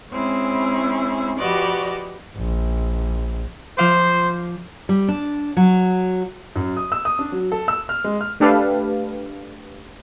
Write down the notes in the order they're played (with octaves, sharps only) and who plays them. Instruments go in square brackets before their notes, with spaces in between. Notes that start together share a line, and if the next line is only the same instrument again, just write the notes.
[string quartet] G#3 C4 C#4 E4
F3 F#4 G4 B4 D5 D#5
[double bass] A#1
[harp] F3 F5 D6 [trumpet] C5
[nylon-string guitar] G3
D4
F#3
[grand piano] F#2
D#6
E6
D#6
D4
F#3
A4
E6
F6
G#3
F6
[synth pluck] A3 D4 G4 A4 B4 F5